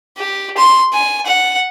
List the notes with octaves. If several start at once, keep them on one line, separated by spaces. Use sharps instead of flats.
G4
C6
G#5
F#5